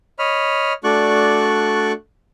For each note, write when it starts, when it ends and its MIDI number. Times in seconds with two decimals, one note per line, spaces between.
0.19 0.73 73
0.19 0.73 75
0.19 0.73 83
0.19 0.73 89
0.84 1.92 57
0.84 1.92 62
0.84 1.92 66
0.84 1.92 74
0.84 1.92 85
0.84 1.92 90